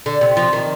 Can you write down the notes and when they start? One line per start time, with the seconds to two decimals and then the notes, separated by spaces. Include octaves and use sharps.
0.06 D3
0.21 C3
0.37 F3
0.53 D#3